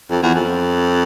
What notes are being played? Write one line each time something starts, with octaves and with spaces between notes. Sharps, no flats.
F2
E2
F2